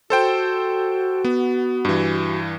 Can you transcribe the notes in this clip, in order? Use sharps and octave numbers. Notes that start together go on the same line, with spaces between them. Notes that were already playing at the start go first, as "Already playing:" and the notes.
F#4 A4 C5 G5
B3
G2 E3